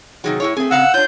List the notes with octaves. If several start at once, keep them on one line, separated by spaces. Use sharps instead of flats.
C3 D#3 F#3 G#4
A2 E4 C#5
A3 C4 G#4
C#3 F5 F#5 A#5 E6
D4 F4 C#5 G6